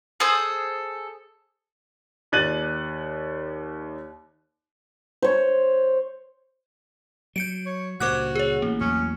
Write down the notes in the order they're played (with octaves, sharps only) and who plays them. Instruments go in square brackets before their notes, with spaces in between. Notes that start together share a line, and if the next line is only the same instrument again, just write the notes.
[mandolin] G#4 A4 C5 D#6
[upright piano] D#2 D5 F#6 A6 D#7 F#7
[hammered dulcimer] C5 C#5
[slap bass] F#3 [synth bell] G6 C#7 D7
[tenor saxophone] C#5
[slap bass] C#2 G2 A#2 [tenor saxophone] F#4 [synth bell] C5 D6 F#6
[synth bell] G#4 C#5
[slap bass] A1 [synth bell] A#3
[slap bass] A1 E2 F#3 [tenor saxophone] C#4